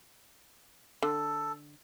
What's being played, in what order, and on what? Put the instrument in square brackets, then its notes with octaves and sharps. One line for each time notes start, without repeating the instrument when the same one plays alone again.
[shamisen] D3 [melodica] A4